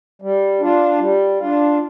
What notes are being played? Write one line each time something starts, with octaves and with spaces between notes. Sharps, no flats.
G3
D4 F4
G3
D4 F4